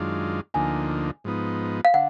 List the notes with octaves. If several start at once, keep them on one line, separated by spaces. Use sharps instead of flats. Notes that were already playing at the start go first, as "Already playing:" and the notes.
Already playing: F#2 D#3 G#3 D4 F4
D2 D3 F3 A#3 D#4 G#5
G#2 F3 B3 D#4
F5
D3 F#5